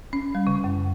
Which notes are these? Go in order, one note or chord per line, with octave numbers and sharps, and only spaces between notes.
C#4
G3
C#3
F#2